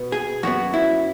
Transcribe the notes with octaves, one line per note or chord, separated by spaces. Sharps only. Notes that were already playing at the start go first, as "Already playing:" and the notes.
Already playing: B2 B3
G#4
F#2 F#3 B3 F#4
E4